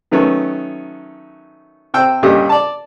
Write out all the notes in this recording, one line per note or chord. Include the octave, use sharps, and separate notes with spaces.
D#3 F#3 A3 B3 C#4
C3 C5 G5 E6
G2 A#2 D3 C#4 G4 D#5
D5 A5